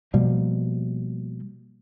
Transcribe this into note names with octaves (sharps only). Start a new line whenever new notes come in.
B2 F3 G3 A#3